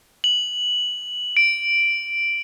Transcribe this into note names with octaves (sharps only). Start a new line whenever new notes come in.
F#7
D7